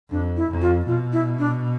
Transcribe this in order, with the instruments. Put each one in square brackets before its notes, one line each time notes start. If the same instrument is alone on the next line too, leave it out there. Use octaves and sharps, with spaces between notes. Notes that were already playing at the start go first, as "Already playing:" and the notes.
[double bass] F2 [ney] D4
[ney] E4
[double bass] F2
[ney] F4
[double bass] B2 [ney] F4
[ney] E4
D4